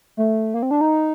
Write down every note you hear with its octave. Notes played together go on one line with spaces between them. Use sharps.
A3
A#3
C4
D4
D#4